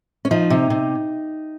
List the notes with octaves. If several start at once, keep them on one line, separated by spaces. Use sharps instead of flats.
C#4
F3 D#4
C3
C3